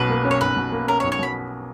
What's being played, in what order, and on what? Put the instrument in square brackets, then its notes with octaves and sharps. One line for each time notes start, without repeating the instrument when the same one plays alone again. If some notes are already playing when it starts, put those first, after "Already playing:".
Already playing: [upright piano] B1 B2 C#4 [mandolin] B4
[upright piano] A#3
C#4
[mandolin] C#5
[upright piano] B1 [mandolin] B4
[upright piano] B2
A#3
[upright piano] C#4 [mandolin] A#4
[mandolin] C#5
[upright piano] B1
[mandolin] C#5
[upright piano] B2 [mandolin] B5